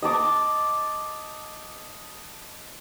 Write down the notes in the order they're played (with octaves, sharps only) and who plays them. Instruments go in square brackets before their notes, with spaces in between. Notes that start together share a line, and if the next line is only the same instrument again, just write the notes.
[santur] D#5 A5 D6